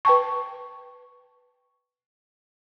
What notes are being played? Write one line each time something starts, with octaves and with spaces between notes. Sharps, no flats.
B4 G5 A5 C#6